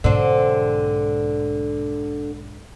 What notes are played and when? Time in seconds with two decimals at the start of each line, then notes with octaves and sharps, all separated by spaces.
0.04 B1 G#2 D3 C4 D4